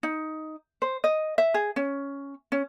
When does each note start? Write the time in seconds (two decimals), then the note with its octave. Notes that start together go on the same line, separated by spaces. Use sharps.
0.03 D#4
0.82 C5
1.04 D#5
1.38 E5
1.54 G#4
1.76 C#4
2.52 C#4